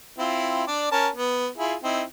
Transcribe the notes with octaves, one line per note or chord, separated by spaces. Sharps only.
C4 E4 F4
D4 D5
C#4 A#4 A5
B3
E4 F4 G#4
C4 D#4 E4